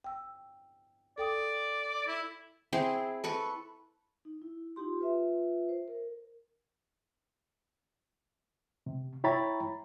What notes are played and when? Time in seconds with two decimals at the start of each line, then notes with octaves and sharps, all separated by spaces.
0.04 G5 E6
1.18 A4 D5 G5 D#6
2.07 E4
2.73 C4 E4 G#4 C5
3.24 A4 B4 C#6
4.25 D#4
4.42 E4
4.76 D#4 F4 G4 C6
4.99 F4 B4 E5
5.69 C5
5.88 A#4
8.86 C3
9.24 E4 C#5 G5 A#5 B5 A6